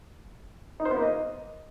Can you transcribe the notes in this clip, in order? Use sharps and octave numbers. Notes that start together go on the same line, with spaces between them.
D#4
C5
B3
A#3
D#5